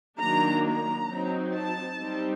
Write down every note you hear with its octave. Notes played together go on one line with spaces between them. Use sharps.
D#3 F#3 A#3 D4 A#5
A#5
F#3 C4 D#4
A5
G3 C4 D#4